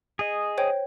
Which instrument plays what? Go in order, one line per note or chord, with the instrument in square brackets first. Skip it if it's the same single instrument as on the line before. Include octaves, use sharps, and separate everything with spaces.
[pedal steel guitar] G#4 D#5
[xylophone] C5 C#5 G5